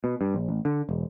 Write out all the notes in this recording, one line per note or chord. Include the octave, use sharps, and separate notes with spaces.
B2
G2
A#1
A1
D3
E1